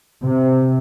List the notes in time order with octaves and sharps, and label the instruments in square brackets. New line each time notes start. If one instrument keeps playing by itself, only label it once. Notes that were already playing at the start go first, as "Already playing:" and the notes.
[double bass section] C3